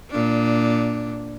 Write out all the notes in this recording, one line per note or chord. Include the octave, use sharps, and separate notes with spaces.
A#2 D4